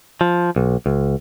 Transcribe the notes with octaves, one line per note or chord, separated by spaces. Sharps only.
F3
B1
C#2